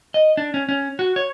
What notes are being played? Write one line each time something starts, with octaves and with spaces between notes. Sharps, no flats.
D#5
D4
C#4
C#4
F#4
C#5